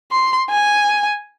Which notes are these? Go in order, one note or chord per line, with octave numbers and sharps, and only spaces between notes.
C6
G#5